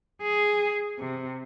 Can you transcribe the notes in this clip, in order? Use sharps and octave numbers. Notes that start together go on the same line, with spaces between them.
G#4
C3